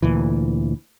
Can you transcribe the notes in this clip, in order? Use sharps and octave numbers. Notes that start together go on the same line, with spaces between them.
D2 A#2 E3